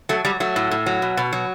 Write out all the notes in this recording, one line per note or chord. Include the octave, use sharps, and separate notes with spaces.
F#3 A3
F#3 G3
F#3 A3
A2
A2
F#3
B2
B2
F#3